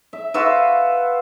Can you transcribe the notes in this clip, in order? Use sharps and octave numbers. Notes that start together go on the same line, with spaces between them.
E5
F4 F#4 B4 E5